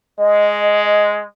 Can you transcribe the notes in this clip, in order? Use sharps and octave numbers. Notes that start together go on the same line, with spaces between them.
G#3 D#5